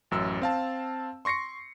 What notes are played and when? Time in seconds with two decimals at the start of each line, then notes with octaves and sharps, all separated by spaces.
0.11 A1 F#2 E6
0.42 C4 F5 A5
1.25 C6 C#6 A#6 C7 C#7